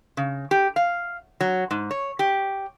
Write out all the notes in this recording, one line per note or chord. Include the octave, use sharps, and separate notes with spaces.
C#3
G4
F5
F#3
G#2
C#5
G4